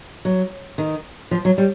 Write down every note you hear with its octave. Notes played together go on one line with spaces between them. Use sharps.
F#3
D#3
F3
F#3
G3